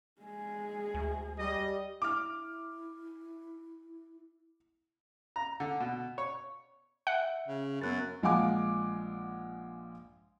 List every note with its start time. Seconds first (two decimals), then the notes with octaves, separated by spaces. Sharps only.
0.22 G#3 G#4
0.94 D2
1.39 G3 D#5
2.02 E4 D6 F6
5.36 A#5
5.60 D3
5.80 B2
6.18 C#5
7.07 E5 F#5
7.48 C#3
7.81 F#2 B3 F#6 A6
8.23 A#1 G#3 F5 F#5 G#5 D6